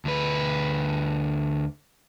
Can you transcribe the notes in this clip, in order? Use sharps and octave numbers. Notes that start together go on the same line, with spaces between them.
D2 B4